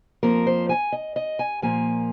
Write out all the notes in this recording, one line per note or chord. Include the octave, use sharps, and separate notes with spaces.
F2 F3 A#3 A#4
C5
G#5
D#5
D#5
G#5
A#2 F3 A#3 G#5